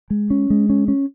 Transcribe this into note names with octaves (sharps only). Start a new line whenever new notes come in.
G#3
C#4
G#3
C#4
C#4